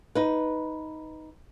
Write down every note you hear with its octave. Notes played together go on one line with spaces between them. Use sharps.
D#4 B4